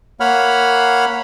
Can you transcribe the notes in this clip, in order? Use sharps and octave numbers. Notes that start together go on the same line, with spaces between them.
A#3 C#5 F#5 B5 F6